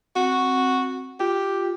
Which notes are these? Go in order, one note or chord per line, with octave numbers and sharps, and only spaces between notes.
C4 F#4
F4 G4